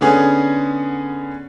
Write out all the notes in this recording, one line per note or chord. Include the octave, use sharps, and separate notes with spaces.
D3 B3 C#4 G#4